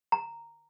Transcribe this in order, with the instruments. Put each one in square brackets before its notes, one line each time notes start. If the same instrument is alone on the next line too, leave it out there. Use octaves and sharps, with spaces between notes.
[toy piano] A#5